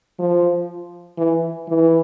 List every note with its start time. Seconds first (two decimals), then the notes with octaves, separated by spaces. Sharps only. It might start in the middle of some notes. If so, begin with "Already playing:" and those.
0.19 F3
1.18 E3
1.68 E3